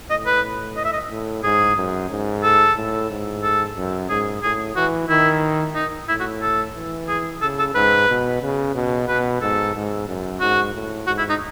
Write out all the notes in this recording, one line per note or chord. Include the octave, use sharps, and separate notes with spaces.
A2 D#5
B4
D#5
E5
D#5
A2
G#2 G#4
F#2
G#2
A4
A2
G#2
A4
F#2
G#2 G#4
A2 G#4
E3 F#4
D#3 E4
D#4
A2 E4
F#4
A4
E3
G#4
C#3 A4
A4
G#2 B4
B2
C#3
B2
B2 B4
G#2 A4
G#2
F#2
G#2 F#4
A2
G#2 F#4
E4
D#4